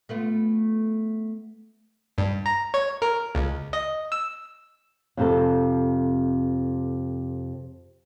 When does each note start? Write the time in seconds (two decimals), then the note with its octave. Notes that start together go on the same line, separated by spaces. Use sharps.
0.09 A3 B3 F4
2.18 G2
2.46 A#5
2.74 C#5
3.02 A#4
3.35 C#2
3.73 D#5
4.12 E6
5.17 F2 C3 A4